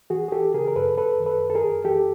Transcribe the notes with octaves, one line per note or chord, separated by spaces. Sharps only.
E3 F#4 G#4
G#4
E3 G4 A4
C#3 G#4 A#4
A#4
F#2 A4 B4
F#2 A4 B4
D#3
A4 B4
F#2
A4
G#4 A#4
F#2
E3 G4 A4